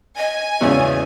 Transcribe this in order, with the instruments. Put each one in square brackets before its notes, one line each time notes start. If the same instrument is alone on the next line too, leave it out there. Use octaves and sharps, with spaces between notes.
[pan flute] D#5 [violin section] G#5
[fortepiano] G#1 C#3 C#4 [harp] E2 [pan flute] D5